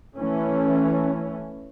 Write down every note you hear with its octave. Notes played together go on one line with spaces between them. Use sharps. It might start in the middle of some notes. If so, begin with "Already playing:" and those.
E3 A3 C#4